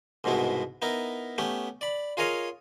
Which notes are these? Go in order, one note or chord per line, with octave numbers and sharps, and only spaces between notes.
C2 G#2 B2 B3 E4
B3 D#4 E4 A#4
A3 B3 C#4 G4
D5 B5
F4 G#4 A#4 C#5 D#5 F5